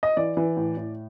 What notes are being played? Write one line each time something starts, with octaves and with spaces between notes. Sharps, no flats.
D#5
E3 D5
E3
A2
A2